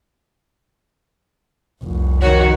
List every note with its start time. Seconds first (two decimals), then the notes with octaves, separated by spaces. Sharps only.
1.83 F1 C2
2.21 D#3 F#4 C#5